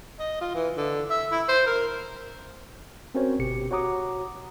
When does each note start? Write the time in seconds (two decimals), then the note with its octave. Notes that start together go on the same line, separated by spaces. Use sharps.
0.19 D#5
0.41 F4
0.55 E3
0.77 D3
1.10 E5
1.32 E4
1.48 C5
1.66 A#4
3.15 C4 C#4 F#4 A#4 C5 C#5
3.39 G1 B2 G4 C#7
3.71 F#4 C#5 F#5 A#5 D6 D#6